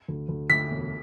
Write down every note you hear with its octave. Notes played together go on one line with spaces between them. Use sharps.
D2
D2
D2 B6
E1